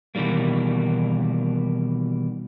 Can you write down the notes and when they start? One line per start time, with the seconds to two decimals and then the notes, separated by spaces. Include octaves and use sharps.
0.15 B2 D#3 E3 G3 A#3